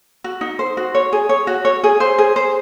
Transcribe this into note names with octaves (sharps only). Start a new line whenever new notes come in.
F#4
D#4
C5
F#4
C#5
G#4
C#5
F#4
C#5
G#4
C5
G#4
C5